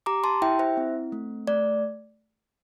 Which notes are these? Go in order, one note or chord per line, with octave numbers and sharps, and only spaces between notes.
G4 A#5 D6
A5 C6
E4 E5 G5
C5 E5
C4
A3
A3 D5